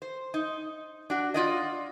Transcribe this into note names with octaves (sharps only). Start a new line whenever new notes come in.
C5
D#4
D4 F#4
F4 D5 D#5